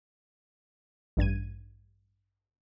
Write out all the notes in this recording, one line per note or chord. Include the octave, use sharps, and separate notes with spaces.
A1 G2 G#6 D#7